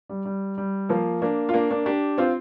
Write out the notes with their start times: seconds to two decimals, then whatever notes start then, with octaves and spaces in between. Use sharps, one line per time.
0.09 G3
0.25 G3
0.58 G3
0.89 F3 A#3
1.22 A#3 D4
1.49 F4
1.54 A#3 D4
1.71 A#3 D4
1.86 D4 G4
2.18 C4 F4